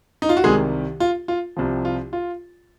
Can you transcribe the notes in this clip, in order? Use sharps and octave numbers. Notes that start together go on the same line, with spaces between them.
D#4
F4
F#4
C2 C3 D#3 G#3 G#4
F4
F4
C2 C3 F3
F4
F4